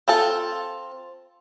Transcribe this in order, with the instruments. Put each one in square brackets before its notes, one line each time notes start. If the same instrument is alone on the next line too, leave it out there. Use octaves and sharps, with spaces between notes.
[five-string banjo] C4 F4 A4